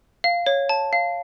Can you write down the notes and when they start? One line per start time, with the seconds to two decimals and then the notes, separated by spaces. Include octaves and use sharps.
0.24 F5
0.46 C#5
0.69 A5
0.93 F5